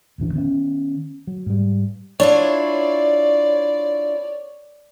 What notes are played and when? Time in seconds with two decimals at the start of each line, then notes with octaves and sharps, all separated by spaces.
0.18 D#1 A1 E3 D4
0.33 D#3 B3 C#4
1.27 F#3
1.46 G#2 G3
2.20 D4 E4 F4 C#5 D5